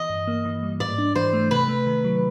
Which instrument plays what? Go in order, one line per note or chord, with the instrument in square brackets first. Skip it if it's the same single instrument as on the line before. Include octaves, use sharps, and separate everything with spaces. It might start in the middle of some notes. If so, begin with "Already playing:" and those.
Already playing: [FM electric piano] E3 [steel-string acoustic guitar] D#5
[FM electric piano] G2
A#3
E3
G3
[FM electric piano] G#2 [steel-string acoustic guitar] D5
[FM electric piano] D4
[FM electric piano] E3 [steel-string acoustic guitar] C5
[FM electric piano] A3
[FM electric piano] C3 [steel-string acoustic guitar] B4
[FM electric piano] A3
D#3
F#3